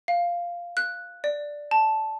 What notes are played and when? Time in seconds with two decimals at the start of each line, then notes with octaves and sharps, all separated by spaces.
0.08 F5
0.77 F#6
1.24 D5
1.71 A5